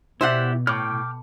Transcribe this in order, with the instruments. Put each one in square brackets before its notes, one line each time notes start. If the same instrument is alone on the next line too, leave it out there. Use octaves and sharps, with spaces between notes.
[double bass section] B2 [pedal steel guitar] E4 G4 D5 [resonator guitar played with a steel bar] C5 E5 F#5
[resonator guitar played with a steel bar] A2 [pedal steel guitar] G5 D6 F6